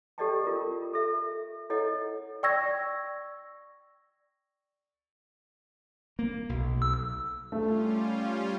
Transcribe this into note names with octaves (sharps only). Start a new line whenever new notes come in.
G4 A4 D5 D#5 G5 A5
F4 A#4
A4 E5
E4 A4 C#5 D#5 F#5
D5 G5 C#6 E6 G#6 A#6
A#3
B1
E6
G3 A3 C#4 F4